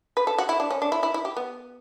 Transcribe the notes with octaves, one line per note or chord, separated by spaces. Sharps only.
B4
A4
F#4
E4
D4
C#4
D4
E4
E4
E4
G4
B3